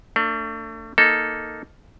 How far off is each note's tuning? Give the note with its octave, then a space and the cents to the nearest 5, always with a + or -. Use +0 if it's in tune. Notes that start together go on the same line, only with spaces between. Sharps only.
A3 +35 D4 +0
A#3 +0 D#4 +0 A4 +0